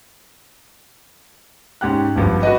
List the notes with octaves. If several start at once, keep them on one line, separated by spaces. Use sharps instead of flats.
G#2 C#4 G4 F#6
G#1 G2 F3
F#4 B4 D#5